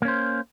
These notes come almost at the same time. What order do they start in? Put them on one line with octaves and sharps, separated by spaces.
A#3 C#4 C5